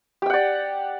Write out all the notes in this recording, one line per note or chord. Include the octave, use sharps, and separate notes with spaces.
G4 D5 F#5 G5